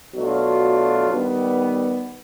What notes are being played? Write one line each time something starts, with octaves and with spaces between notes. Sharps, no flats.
B2 F#3 A3 D4 F4
D#3 G3 B3